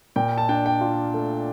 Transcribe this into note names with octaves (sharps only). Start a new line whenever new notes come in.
A#2 G5
A5
D4 G5
G5
F4
A3